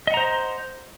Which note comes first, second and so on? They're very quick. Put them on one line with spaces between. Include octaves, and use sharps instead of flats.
D#5 F#5 A#5 C5